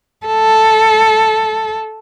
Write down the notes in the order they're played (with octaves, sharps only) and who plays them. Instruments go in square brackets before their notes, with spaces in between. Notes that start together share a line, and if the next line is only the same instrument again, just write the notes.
[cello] A4